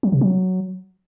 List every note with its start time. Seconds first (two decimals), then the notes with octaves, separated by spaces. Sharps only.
0.03 F#3
0.12 C3
0.21 F#3